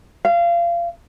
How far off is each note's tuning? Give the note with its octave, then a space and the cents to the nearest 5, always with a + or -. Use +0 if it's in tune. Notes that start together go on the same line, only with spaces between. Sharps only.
F5 -25